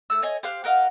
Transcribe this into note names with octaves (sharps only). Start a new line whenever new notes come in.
A3 E6
C#5 D#5 G#5
G4 C5 F5 F#6
F#4 A#4 D#5 F5